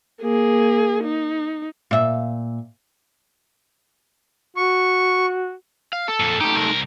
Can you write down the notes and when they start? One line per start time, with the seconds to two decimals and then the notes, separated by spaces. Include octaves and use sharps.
0.22 A#3 G#4
1.04 D#4
1.91 A#2 E5
4.57 F#4 C#6
5.93 F5
6.08 A4
6.20 F2 A#2
6.41 A3 D#4 G4
6.57 C2 A#4